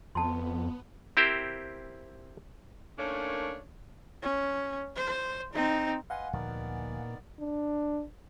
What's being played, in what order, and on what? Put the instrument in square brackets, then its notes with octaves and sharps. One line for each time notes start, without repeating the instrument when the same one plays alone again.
[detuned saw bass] F2 [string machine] B3 [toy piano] A5 C6
[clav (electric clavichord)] C4 E4 G4 A#4 C5
[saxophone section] D#3 A3 A#3 C#4 D4 C#5
[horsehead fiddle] C#4
C5
C4 D#4
[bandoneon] B4 D#5 C6 [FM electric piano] F5 F#5 G#5
[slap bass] D2 F3 A#3 [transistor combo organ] A#2 [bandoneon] D#3 B3 D5
[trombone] D4